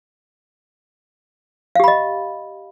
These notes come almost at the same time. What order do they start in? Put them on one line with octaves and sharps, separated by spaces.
F5 G4 B5 D#5